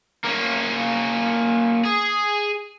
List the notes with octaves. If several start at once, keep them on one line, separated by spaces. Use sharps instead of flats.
A#3 C#4
G#4